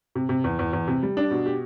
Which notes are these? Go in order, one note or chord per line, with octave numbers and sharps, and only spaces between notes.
C3
C3
E2
E2
E2
C3
G3
D4
B2
G4